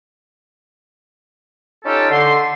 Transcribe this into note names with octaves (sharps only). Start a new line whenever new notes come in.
C#4 D#4 F4 G4 A4
D3 C6